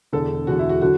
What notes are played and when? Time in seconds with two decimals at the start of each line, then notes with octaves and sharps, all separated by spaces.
0.13 E1 E2 D3 A4
0.47 E1 E2 D3 F#4
0.59 E4
0.69 F#4
0.81 D3 F#3 F#4